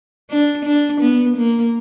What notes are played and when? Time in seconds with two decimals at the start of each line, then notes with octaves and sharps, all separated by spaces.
0.30 D4
0.65 D4
1.01 B3
1.37 A#3